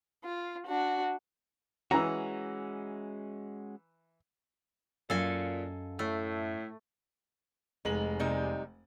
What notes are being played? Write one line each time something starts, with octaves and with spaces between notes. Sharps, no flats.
F4
D4 F#4
E3 G#3 C#4 F#4 A#5
F#2 A#2 A4 D#5 F5 G#5
A2 A3
F1 G#3 D#4 F#7
C3 G3 D#4